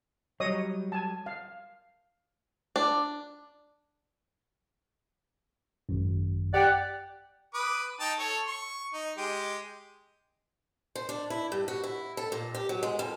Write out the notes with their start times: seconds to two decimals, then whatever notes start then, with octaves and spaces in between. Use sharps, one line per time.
0.40 F#3 G3 C#5 D#5 D#6
0.92 G#5 A5
1.26 F5
2.76 D4
5.89 G#1 F#2
6.54 G4 D5 F#5
7.54 B4 D6 D#6
8.00 D#4 G5 A5
8.19 A4 C#5
8.48 C#6
8.94 D#4
9.18 G#3 G4
10.96 C5
11.09 D4
11.30 E4
11.52 G2
11.68 F#4
11.84 E4
12.17 A4
12.32 A#2
12.55 G4
12.69 F#3
12.83 G#3
12.99 F2